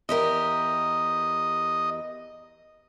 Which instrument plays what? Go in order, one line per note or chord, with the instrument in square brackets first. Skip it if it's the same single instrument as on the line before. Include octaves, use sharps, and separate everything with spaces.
[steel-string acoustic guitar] E2 G4 A#4 [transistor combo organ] D#5